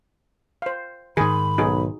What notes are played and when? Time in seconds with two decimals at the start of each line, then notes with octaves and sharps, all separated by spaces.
0.62 C5 F5
1.17 G#2 D#3 G#4 B5
1.58 B1 D#4 F#4 G#4